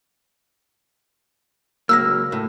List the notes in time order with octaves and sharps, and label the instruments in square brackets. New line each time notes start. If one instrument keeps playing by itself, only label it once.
[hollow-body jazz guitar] C#2 F#3 A#3 [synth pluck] E6 F6 A#6
[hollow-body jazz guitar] A2